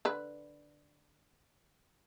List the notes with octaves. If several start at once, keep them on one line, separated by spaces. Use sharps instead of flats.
D3 B4